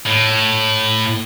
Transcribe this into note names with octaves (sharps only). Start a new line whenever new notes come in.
A2